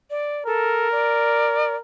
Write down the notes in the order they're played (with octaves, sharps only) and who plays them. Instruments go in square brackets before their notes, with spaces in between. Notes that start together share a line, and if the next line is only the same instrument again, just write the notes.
[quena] D5
[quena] A4 [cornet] A#4
[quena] D5